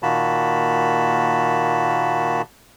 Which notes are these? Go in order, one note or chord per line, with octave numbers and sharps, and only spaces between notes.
A#2 D#3 A#3 F#4 A5 B5